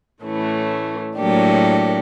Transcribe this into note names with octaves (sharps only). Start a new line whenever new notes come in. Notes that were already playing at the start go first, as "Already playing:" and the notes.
A2 E3 A3 C#4
A2 F#3 A#3 D4 G4